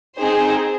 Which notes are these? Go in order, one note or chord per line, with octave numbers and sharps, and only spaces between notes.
C4 D#4 G#4 C5